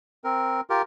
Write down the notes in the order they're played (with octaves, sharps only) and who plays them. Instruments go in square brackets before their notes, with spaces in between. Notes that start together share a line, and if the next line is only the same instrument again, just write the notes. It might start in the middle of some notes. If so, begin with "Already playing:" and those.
[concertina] C4 A#4
F4 G4 A#4